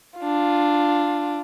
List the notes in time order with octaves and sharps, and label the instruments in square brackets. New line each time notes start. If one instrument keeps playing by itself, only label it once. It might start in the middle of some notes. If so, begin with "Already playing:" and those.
[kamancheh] D4 F4